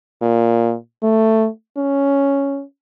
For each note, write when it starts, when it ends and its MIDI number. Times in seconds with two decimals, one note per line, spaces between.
0.21 0.74 46
1.03 1.48 57
1.77 2.62 61